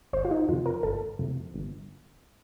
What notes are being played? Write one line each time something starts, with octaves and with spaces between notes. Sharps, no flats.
G1 C5
F4
D#4
F2 C3 F4
A#4
G1 A4
F2 C3
G1